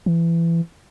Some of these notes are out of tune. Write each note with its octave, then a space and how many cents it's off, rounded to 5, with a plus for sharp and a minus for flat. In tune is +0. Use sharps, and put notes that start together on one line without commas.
E3 +25